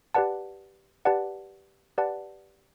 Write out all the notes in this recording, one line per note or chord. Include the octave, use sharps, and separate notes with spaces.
G4 B4 D5 F#5 A5
G4 B4 D5 F#5 A5
G4 B4 D5 F#5 A5